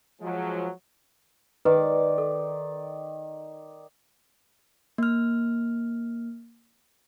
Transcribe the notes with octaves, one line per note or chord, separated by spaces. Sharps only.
F3 F#3 G#3
D#3 B4 D5
A4
A#3 F6